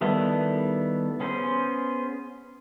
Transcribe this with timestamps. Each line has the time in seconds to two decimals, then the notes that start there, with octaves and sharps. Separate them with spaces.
0.01 D#3 G3 A3 B3 E4
1.20 B3 C#4 G#4 C5